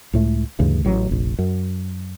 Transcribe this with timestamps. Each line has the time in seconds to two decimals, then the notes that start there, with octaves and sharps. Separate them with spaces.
0.13 C#2 A2 A3
0.59 D2 G2 C#3 E3
0.85 A1 A2 F#3
1.09 F1 A#1
1.39 F#2